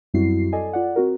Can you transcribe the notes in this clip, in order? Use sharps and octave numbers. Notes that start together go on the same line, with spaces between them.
F#2 G3 C4 E4 F#4 C7
A4 D5 D#5 G#5
F4 D5 F#5
C4 F#4 A#4